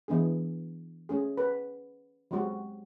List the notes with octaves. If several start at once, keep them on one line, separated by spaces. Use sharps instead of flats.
E3 B3 D4 G#4
A3 C#4 G#4
B4
F#3 G#3 C4 F#4 G4